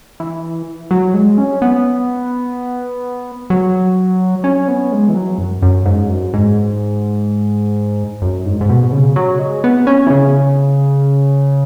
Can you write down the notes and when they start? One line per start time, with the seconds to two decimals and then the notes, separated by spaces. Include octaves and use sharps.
0.20 E3
0.91 F#3
1.14 G#3
1.38 C#4
1.62 B3
3.50 F#3
4.44 C#4
4.68 B3
4.92 G#3
5.09 E3
5.15 F#3
5.38 F#2
5.62 F#2
5.85 G#2
6.09 F#2
6.34 G#2
8.22 F#2
8.46 G#2
8.61 G#2
8.69 B2
8.92 C#3
9.16 F#3
9.39 G#3
9.64 B3
9.87 C#4
10.07 E3
10.10 C#3